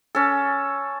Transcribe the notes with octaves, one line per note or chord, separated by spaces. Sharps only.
C#4 A4